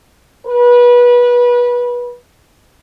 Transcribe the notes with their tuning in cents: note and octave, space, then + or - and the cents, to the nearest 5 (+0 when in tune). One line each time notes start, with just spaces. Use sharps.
B4 -25